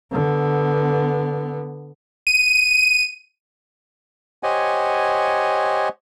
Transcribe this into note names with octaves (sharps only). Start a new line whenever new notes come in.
D3 B3
D#7
G4 C5 C#5 D#5 F#5 G#5